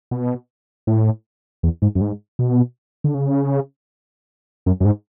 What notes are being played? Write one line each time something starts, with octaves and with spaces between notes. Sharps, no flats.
B2
A2
E2
G#2
F#2
G#2
B2
D3
C#3
F#2
F#2
G#2